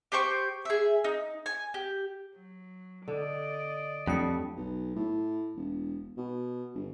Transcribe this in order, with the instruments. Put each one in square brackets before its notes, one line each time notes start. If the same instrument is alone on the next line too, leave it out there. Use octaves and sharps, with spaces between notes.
[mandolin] G4 C5 G5 C#6
G#4 E5
D#4
G#5
G4
[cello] F#3
[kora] D3 [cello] D5 D#5
[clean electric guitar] F2 [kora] G3 C#4 A4 [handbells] A3 D4 C#7
[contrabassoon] B1
A2
E1
B2
G1